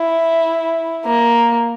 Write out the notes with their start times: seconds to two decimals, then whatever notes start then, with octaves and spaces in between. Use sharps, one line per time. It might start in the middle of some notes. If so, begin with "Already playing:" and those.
Already playing: E4
1.05 A#3